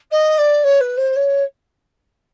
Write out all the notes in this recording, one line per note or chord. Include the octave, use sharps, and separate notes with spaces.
D#5
D5
C#5
B4
C5
C#5